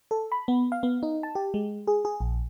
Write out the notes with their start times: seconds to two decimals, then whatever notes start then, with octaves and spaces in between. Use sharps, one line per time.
0.11 A4
0.32 B5
0.48 B3
0.72 F5
0.83 B3
1.03 D#4
1.23 A5
1.35 G4
1.54 G#3
1.87 G#4
2.05 G#4
2.20 A#1